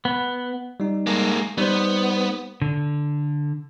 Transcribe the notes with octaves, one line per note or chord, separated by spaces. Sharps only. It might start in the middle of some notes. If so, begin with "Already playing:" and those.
B3
G3 D#4
G#3 A#3
G3 B3 D#4 C5
D3